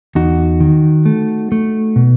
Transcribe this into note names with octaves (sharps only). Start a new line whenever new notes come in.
E2 D#4 F#4
D#3
A3
A3
B2